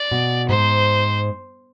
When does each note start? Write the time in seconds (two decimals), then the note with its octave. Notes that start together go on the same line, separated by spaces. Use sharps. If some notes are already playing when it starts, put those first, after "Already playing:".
Already playing: D5
0.11 B2
0.49 G#2 C5